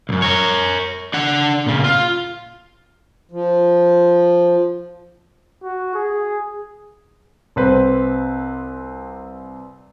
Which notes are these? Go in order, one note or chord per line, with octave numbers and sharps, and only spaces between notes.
C2 F#2
A#4 C#5
D4 F#5
A#2 C#3
F4
F3
F#4
G#4
C2 C4 B4